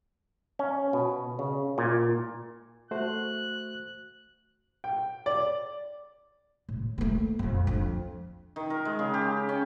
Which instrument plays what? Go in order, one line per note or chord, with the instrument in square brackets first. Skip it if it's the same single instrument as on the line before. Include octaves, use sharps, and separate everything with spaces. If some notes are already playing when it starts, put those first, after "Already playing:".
[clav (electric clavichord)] C#4
B2
C#3
A#2
[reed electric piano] A3 F#4 C5 [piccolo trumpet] F#6
[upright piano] G5
D5
[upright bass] A2
A3 A#3
A#1 F2
F2 D4
[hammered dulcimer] D#3
A#4
G#3
C#3
G4
C#4